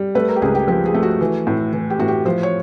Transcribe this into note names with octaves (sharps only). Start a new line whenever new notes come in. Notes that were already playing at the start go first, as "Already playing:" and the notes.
Already playing: G3
A3 B4
A#4
G4
C#2 G#4
G4
F3 G4
G#4
A3
F#4
E3
A2
E3
G4
A2 F#4
G4
F3 C5
C#5